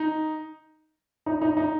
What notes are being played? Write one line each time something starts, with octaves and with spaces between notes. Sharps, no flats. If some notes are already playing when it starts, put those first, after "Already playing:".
Already playing: D#4
D#4
D#4
D#4